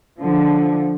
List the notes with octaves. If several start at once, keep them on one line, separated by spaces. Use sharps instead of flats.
D3 F3